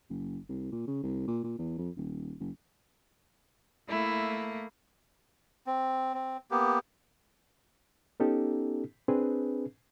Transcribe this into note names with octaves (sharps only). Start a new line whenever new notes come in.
F#1
C2
A#2
C#3
C2
A#2
A#2
E2
F2
D#1
F#1
A3 A#3 E4
C4
C4
A#3 B3 G4
B3 C#4 D#4 G4 A4
C4 D4 G#4 B4